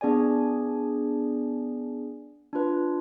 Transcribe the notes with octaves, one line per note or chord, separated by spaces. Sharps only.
B3 D4 G#4 D5 G#5
D4 F4 B4